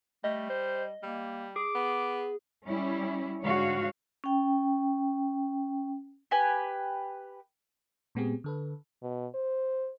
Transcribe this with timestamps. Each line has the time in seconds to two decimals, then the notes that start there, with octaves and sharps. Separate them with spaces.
0.24 G3 A3 D#5
0.50 C5
1.03 G3 A#3
1.56 G#4 D6
1.75 B3
2.66 G3 C#4 E4
3.42 G#2 D3 G#3 F#4 C#5 F5
4.24 C#4 G5
6.31 G4 B4 G#5
8.15 A#2 G#3 B3 C4 G4 G#4
8.44 D3 A4 B4
9.03 B2
9.35 C5